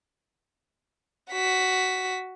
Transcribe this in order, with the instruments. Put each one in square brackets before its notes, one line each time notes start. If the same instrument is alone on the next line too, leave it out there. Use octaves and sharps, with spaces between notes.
[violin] F#4 B6